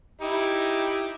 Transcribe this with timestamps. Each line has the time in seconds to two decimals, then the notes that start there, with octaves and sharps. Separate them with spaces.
0.22 D#4 E4 G4